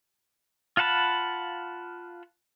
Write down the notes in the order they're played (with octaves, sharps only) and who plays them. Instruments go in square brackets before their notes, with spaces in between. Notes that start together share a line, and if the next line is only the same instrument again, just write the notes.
[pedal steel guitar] F4 F5 F#5 A5 B5